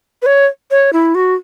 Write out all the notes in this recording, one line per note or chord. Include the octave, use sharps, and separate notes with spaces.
B4
C#5
C#5
E4
F#4